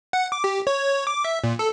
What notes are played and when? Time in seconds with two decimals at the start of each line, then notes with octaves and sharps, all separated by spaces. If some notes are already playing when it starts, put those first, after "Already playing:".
0.13 F#5
0.32 D6
0.44 G4
0.67 C#5
1.07 D6
1.24 E5
1.44 A#2
1.59 A4